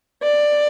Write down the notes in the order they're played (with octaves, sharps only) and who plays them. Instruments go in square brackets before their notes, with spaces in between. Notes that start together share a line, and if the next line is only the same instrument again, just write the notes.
[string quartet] D5